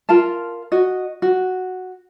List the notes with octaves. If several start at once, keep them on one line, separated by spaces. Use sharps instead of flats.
F4 A#4 F5 A5
F#4 D#5
F#4